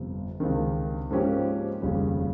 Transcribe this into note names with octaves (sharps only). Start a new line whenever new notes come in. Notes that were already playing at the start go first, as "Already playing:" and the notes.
Already playing: G1 F2 C3
C#2 C3 D#3
G#2 F3 A#3 C#4 G4
F1 D#2 C#3 G3